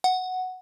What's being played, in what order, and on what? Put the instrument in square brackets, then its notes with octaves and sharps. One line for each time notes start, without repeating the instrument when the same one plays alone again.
[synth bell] F#5